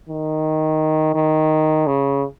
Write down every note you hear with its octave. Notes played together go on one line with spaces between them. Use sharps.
D#3
D#3
C#3